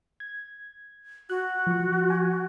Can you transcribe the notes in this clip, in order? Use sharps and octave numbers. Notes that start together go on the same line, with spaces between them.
G#6
F#4 F#6
F3 C#6
G#5